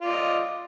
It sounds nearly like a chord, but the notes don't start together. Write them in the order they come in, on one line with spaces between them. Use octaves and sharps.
F4 D5 D#5